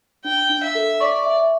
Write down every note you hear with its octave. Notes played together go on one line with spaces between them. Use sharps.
D4 G5
D4
E5
A4
D5 C#6
E5